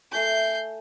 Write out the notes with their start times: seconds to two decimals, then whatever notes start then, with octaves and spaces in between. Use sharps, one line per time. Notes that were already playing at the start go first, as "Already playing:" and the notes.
0.12 A3 G#5 A5 G6 C7